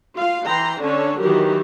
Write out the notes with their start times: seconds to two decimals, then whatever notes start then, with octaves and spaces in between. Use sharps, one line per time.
0.16 F4 F5
0.47 E3 G5 A#5 C6
0.81 D3 C#4 D4 A4 C#5
1.20 D#3 E3 F#3 G4 A#4